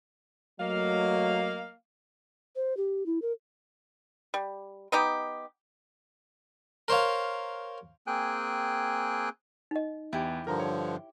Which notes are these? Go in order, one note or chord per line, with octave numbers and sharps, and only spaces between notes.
F#3 A3 A#3 D#5 F5
C5
G4
E4
A#4
G3
B3 D#4 G4
A#4 C5 C#5 F5
A#3 C4 G#4 G5 G#5 F#6
D#4 D#5
E2 E4 G4
G2 D3 F3 A#4 A#5
C#5